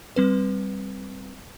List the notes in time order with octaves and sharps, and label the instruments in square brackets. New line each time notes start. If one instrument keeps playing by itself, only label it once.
[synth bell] G3 C4 B4